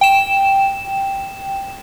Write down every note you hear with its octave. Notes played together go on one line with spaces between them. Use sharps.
G5 E7